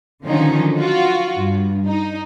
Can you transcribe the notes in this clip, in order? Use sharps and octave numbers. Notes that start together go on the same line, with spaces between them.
D3 D#3 F3 F#3 C#4 D#4
F4 F#4
G2
D#4